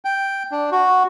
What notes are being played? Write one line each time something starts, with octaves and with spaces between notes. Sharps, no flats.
G5
D4
F#4